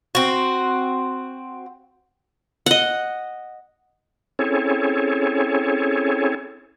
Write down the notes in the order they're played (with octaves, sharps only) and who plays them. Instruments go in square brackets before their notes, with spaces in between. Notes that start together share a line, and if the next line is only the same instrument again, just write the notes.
[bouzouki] C4 F#4
[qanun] D#5 F#5
[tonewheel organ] C4 C#4 E4 G#4 A4 C#5